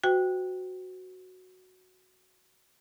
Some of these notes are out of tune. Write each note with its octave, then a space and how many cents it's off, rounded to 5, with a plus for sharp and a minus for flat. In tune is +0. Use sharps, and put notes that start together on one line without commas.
F#4 +0 C5 -45 G5 +0